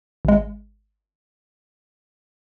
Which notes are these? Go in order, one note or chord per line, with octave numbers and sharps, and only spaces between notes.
G#1 G#3